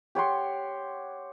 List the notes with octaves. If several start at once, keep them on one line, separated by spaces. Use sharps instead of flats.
G4 C#5 F#5 C6